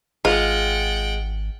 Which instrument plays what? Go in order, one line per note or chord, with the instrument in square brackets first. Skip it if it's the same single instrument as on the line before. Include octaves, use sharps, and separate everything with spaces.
[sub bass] G#1 [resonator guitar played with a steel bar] G#3 [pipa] F4 [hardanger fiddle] F#5 G5